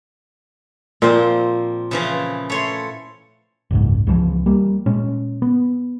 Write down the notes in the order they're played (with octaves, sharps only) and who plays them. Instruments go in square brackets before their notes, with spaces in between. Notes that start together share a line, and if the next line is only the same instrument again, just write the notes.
[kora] A#2 [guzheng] F3 A#3 C4
[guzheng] C#3 E3 F3
A3 C#5 C6
[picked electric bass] F#1 C#2 G#2
C#2 C#3 E3 F3
G3 A#3
A#2 G#3 C#4
B3